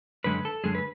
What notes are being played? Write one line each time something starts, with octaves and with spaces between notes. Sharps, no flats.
F#2 D3 G#3 B4
A4
F#2 D3 G#3 G#4
B4